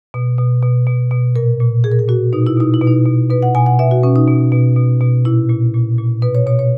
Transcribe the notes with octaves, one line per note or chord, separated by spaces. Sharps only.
B2
B2
B2
B2
B2
A#2 A#4
A#2
A#2 G#4
A#4
G#4
A#2 F#4
B2 D#4
E4
B2 D#4
E4
B2
D#4
B2
B2 B4
F#5
B2 G#5
F#5
B2 E5
F#4
B2 C#4
D#4
B2
B2
B2
B2
A#2 E4
A#2
A#2
A#2
B2 B4
C#5
B2 C#5
C#5